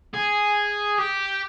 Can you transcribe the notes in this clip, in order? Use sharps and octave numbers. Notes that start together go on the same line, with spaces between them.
G#4
G4